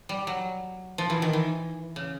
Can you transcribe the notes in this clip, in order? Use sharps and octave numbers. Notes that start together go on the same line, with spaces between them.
G3
F#3
F3
E3
D#3
E3
C#3